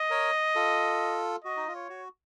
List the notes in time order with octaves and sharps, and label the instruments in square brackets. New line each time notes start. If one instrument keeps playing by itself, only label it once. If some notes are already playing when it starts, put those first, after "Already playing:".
Already playing: [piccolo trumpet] D#5
[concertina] A#4 C#5
F4 A4
[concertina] F#4 [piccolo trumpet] D#5
[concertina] D#4
F4
[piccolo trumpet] C#5
[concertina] F#4